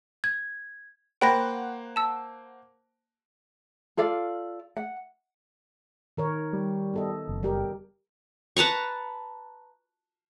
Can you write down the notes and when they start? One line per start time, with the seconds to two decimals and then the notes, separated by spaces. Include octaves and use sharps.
0.24 G#6
1.21 A#3 C5 F#5 G5 B5 A#6
1.96 A5 E6
3.97 F4 A4 D5 F5
4.77 F#5
6.17 D#3 A#4 C#5
6.53 G3
6.94 B3 A4 D#5
7.28 F#1
7.43 G3 G4 A#4
8.57 B4 A5 A#5 C#6